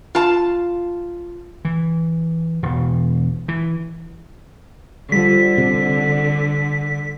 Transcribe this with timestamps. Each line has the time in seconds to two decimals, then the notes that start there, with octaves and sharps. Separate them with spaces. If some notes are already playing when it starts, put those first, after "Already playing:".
0.15 F4 A5
1.65 E3
2.63 E1
3.48 E3
5.12 D3 F3 G3 B6
5.58 C3